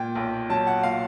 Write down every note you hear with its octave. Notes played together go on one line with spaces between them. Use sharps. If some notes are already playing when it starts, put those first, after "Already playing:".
Already playing: A#2 G5
B1
F#3 A5
F#5
A#2 F5